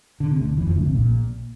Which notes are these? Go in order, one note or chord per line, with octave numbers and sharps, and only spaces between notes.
D3
C3
D2 D3
E2 E3
F2 F3
D2 D3
C2 C3
A#1 A#2